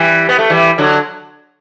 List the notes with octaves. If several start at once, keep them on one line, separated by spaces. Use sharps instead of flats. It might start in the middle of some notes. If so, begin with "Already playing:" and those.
Already playing: E3 G3
B3
A3
E3 G3
D3 F#3